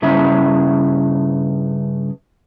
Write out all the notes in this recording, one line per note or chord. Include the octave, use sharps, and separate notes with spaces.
G2 C#3 E4 E5 A#5